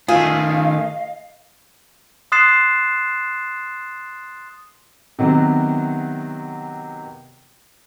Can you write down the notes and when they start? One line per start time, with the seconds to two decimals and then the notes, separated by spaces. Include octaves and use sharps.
0.08 D#3 A3 F4 G#4 D#5 F5
2.32 C6 D#6 F#6 A6 C7 E7
5.19 C3 D#3 F#3 B3 F#4